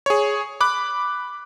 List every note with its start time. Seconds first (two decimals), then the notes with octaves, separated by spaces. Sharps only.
0.06 G#4 C#5
0.61 B5 D6 F#6